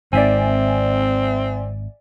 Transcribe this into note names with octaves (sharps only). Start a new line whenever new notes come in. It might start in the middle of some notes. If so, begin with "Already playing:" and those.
G#1 D#3 C4 D5 E5 G#5